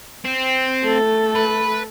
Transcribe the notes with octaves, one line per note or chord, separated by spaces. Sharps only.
C4
A3 A4
B4